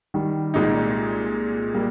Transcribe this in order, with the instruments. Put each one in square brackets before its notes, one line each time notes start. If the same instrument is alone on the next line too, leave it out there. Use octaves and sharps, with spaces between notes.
[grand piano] D#3 G3
[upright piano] C2 A#2 G#3 D#4
[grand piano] G3 A#3